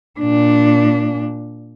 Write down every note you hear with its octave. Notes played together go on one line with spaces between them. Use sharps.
A#2 D4